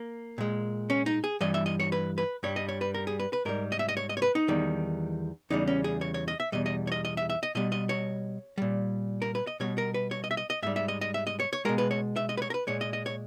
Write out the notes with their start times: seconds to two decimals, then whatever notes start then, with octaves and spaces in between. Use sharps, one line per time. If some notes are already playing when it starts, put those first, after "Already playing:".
Already playing: A#3
0.38 A#2 G#3
0.90 C#4
1.06 D#4
1.24 G#4
1.41 G2 E3 G3 D#5
1.54 E5
1.66 D#5
1.80 C#5
1.92 B4
2.18 B4
2.43 G2 G3 C#5
2.56 D#5
2.69 C#5
2.81 B4
2.94 A#4
3.07 G#4
3.20 B4
3.33 B4
3.45 G#2 G3 A#4
3.72 D#5
3.79 E5
3.89 D#5
3.97 C#5
4.09 D#5
4.17 C#5
4.22 B4
4.35 D#4
4.48 E2 D#3 G3
5.50 E2 C#3 G3 D#4
5.67 C#4
5.84 G#4
6.01 C#5
6.14 C#5
6.28 D#5
6.40 E5
6.52 E2 B2 G3 D#5
6.66 D#5
6.87 C#5
6.92 D#5
7.05 D#5
7.17 E5
7.30 E5
7.43 D#5
7.55 B2 G3 D#5
7.72 D#5
7.89 C#5
8.58 A#2 G3
9.22 A#4
9.35 B4
9.47 D#5
9.60 B2 G3 C#5
9.78 A#4
9.94 B4
10.11 C#5
10.24 D#5
10.31 E5
10.37 D#5
10.50 D#5
10.62 G#2 G3 E5
10.76 E5
10.88 D#5
11.01 D#5
11.14 E5
11.27 D#5
11.40 C#5
11.53 C#5
11.65 B2 G#3 A#4
11.78 B4
11.91 C#5
12.16 E5
12.29 D#5
12.37 B4
12.42 C#5
12.50 A#4
12.54 B4
12.67 A#2 G#3 C#5
12.81 D#5
12.93 D#5
13.06 C#5